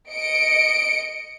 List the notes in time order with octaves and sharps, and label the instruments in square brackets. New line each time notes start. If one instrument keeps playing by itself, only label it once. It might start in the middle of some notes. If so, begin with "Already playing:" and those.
[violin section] D#5 C#7 D7